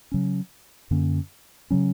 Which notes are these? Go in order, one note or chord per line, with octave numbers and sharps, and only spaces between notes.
C#3 F#3 C#4
F#2 D3 A#3 C#4
C#3 F#3 C#4